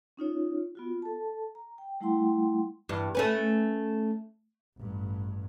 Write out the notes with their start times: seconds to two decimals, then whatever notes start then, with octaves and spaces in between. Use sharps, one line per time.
0.17 C#4 D#4 F4 C#5
0.75 B3 F4 F#4
1.02 A4 A5
1.55 A#5
1.78 G5
2.00 G3 A3 E4 F#5 G5 C6
2.89 E2 G2
3.15 A3 C#4 B4
4.78 A1 G2